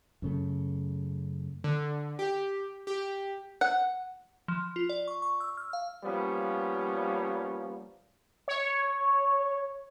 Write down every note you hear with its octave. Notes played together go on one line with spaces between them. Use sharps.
F#2 C#3 A3
D3
G4
G4
F#5
F3
F4
D5
C#6
C#6
E6
F6
F5
F3 G3 A#3 B3 C#4
C#5